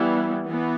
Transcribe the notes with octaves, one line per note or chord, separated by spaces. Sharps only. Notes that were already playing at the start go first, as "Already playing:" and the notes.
Already playing: E3 G3 B3 E4
E3 B3